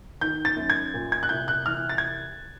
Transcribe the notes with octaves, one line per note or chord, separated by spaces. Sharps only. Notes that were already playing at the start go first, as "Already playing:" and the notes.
D#3 G6
A6
F#2
G#6
A#2
G#6
F#6
C2 G6
F#6
E3 F6
A6
G#6